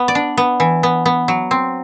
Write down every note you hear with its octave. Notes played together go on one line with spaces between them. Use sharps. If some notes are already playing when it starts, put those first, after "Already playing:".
Already playing: B3
D5
D4
B3
E3
B3
B3
F#3
C4